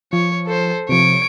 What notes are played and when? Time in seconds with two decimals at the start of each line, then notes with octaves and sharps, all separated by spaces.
0.13 F3 C#5
0.47 A4 C5
0.89 C3 F3 C#5 D7